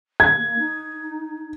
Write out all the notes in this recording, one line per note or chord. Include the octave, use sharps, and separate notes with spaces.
G#6
A#3
D#4